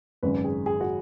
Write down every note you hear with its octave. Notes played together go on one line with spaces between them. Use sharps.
G#1 F#2 C#3 G#3 B4
G#4
G#4
F#4